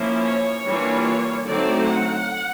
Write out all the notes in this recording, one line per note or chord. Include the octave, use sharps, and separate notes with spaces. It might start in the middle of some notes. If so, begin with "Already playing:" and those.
Already playing: F3 A#3 C#4 E4
C#5
E3 G3 A#3 D4 F4
D3 F#3 A3 C4 D#4 D5
F#5